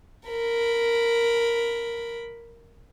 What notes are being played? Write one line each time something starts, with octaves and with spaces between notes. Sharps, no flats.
A#4 B5